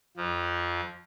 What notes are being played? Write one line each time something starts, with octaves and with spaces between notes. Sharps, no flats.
F2 F3